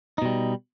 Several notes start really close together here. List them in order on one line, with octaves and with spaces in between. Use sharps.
D#4 B2 G3